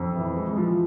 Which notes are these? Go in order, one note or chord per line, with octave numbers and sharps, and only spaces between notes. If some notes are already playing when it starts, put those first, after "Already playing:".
Already playing: F2
E3
G#3
F3